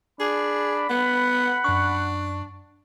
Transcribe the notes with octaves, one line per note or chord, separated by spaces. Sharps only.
D4 G#4 B5
B3 F#5
F#2 D4 C#6